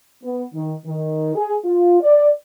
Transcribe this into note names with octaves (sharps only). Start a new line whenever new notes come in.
B3
D#3
D#3
G#4
F4
D5